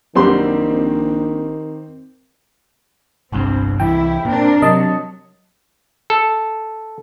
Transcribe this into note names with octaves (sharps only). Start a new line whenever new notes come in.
A#1 F#2 D#3 G3 C4 G4 C6
G1 C2 G2 C4
C2 E3 E4 G5
A#2 C4 D4 A#4
C3 F#3 D#5 A5
A4